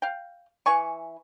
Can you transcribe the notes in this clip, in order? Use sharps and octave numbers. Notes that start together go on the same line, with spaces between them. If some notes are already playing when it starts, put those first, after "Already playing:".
F5 G5
E3 G#5 C#6